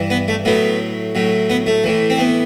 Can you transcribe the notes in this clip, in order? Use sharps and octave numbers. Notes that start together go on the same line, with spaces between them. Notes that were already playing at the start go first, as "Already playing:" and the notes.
Already playing: G2 E3
B3
A3
A2 F#3 B3
A2 F#3
B3
A3
A2 E3
C4
B3